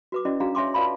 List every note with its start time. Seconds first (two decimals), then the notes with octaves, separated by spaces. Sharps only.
0.12 F#4 B4 D6
0.25 C#4 E4 F#4 D5 D#5
0.40 D4 F#4 G#4 F5 A#5
0.55 C#5 E5 G#5 C6 D6
0.74 F4 B4 D5 F5 A5 B5